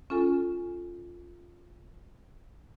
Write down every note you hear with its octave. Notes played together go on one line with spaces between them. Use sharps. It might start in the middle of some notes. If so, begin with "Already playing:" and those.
C#4 F4 A4 G#5